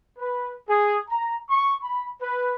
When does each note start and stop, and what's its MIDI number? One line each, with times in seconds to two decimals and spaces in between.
0.18 0.52 71
0.68 0.99 68
1.09 1.37 82
1.49 1.75 85
1.82 2.06 83
2.20 2.55 71